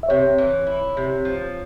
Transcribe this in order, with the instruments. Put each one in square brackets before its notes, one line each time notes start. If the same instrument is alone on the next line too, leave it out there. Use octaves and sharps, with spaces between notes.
[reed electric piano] E5
[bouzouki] C3 [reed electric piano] C#5
[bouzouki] E3
E4
C3
F3